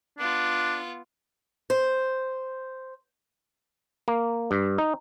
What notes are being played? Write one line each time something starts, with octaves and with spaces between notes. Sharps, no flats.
B3 D4 F4
C5
A#3
G2
D#4